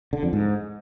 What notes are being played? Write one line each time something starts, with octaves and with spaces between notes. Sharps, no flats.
D3
F2
G#2